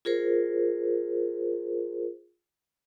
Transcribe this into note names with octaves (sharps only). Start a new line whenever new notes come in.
F4 G#4 A#4 C5